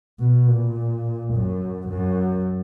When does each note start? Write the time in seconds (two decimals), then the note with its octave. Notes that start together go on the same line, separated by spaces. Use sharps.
0.19 B2
0.48 A#2
1.33 F#2
1.89 F#2